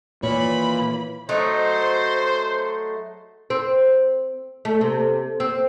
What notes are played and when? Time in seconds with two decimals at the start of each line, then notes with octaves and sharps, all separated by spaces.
0.23 A#2 D#3 E3 C#5 B5
1.29 F#3 A3 D#4 C5
3.50 C4
4.65 A3
4.81 C3
5.40 C4